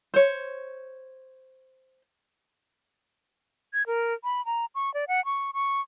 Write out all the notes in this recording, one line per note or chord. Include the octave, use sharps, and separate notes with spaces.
C5 C#5
G#6
A#4
B5
A#5
C#6
D5
F#5
C#6
C#6